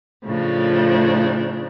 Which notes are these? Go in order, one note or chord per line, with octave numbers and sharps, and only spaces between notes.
A2 C#3 F3 D4